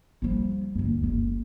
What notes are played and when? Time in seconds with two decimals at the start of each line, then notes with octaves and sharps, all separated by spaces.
0.22 F3 G3
0.75 D2 G2
1.03 F#1